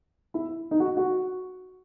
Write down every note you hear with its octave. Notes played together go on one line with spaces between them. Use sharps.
E4
D#4
F#4
F#4